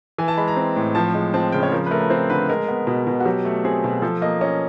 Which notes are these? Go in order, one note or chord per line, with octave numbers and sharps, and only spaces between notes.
E3 G#5
A5
G#3 B5
A#5
C4
A2
F3 A5
G#3
C4 A5
C#3 G5
C#5
F3 A#4
B4
A3 A#4
B4
C4 C5
D3 B4
G#3 A#4
B3
B2
B2
F#4
F#3 G4
A3
C4 G#4
B2
F3 A4
A#3 D#5
C#4 D#5